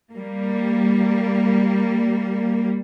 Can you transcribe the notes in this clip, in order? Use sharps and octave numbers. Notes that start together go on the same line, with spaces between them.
G3 A#3